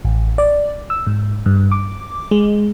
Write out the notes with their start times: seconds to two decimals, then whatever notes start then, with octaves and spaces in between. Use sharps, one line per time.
0.05 A1
0.38 D5
0.90 E6
1.07 G#2
1.46 G2
1.72 D6
2.31 G#3